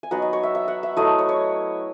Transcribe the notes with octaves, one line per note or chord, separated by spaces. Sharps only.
G#5
F#3 B3 D#4 F#5
D#5
C#5
E5
E5
F#5
E5
F#3 A3 E4 D#5
C#5
C#5